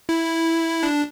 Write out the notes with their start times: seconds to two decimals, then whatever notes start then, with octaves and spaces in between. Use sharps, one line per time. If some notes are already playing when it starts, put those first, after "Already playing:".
0.09 E4
0.83 D4